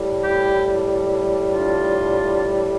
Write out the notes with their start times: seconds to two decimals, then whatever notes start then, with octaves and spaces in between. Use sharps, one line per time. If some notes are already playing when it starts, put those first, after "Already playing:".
Already playing: A2 G3
0.24 E4 G4
1.52 D4 F4